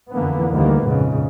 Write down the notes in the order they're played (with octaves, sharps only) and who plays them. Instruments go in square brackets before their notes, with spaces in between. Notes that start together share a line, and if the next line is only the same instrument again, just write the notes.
[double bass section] F2 D3 E3 A#3 B3
D2 D#3 G3 A#3 B3
A#1 F2 G#2 C#3